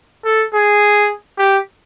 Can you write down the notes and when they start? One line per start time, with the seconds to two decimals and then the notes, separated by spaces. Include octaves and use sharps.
0.25 A4
0.54 G#4
1.38 G4